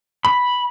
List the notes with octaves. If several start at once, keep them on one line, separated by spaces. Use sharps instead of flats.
B5